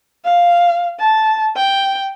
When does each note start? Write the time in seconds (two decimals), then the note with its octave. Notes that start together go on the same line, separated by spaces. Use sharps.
0.24 F5
1.00 A5
1.56 G5